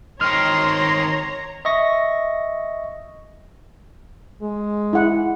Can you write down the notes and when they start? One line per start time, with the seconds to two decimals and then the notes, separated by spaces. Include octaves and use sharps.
0.21 D#3 C4 C#5 A#5 C6 F6
1.65 D#5 E5 C#6 A#6
4.42 G#3
4.93 E4 G#4 F#5